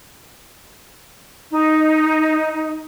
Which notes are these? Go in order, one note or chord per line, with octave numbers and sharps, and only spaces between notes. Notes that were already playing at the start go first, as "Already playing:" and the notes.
D#4